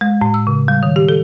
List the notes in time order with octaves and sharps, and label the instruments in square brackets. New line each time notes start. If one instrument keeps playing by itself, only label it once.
[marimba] G#3
A2
E6
C#3
G3
D#3
G4
A4